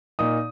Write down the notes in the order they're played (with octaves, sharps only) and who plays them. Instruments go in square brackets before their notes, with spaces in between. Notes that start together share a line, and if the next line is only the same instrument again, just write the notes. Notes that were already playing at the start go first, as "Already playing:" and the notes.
[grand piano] A#2 A#3 D#4 D#6